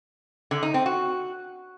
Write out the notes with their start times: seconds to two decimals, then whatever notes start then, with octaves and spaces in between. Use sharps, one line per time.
0.51 D3
0.63 D#4
0.74 C4
0.86 F#4